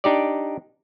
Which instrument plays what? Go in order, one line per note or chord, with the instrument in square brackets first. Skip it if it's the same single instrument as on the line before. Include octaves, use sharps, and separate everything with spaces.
[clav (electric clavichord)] D4 D#4 G4 D5